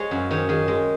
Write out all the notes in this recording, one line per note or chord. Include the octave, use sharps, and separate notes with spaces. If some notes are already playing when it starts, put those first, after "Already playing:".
Already playing: G#3 C#5
F#2
D#3 C#5
D#3 G#4
G#3